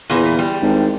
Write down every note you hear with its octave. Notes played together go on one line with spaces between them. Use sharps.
E2 A#2 E3
G3
G#1